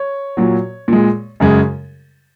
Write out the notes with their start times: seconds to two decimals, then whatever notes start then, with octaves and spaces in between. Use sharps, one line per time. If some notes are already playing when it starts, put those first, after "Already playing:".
Already playing: C#5
0.37 A#2 F#3
0.88 A#2 G#3
1.40 F#2 C#3 G#3